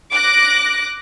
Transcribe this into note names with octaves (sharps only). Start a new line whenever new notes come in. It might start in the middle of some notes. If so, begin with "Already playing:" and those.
D6 F#6 A#6